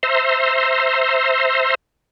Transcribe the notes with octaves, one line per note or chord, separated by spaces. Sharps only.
C5 E5 A#5 C6